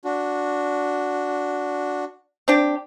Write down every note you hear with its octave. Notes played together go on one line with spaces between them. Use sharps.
D4 F#4
C4 D4 G4